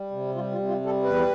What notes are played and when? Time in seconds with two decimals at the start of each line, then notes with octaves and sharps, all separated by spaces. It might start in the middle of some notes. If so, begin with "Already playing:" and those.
Already playing: G3
0.11 C3
0.35 G3 F4
0.52 F4
0.58 C3
0.68 F4
0.81 G3 A4
1.03 E2 B4